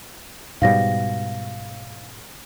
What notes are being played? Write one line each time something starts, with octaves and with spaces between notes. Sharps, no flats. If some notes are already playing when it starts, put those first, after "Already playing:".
G#2 B2 G3 F5 A#6